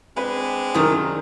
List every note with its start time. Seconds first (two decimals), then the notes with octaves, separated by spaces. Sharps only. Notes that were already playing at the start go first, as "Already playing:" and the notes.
0.17 G#3 C4 D4 B4
0.74 F#2 C3 D#3 A3 E4 A#4 D#6